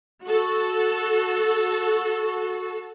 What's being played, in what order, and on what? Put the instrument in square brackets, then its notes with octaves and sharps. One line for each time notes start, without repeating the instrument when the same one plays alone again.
[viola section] F#4 A4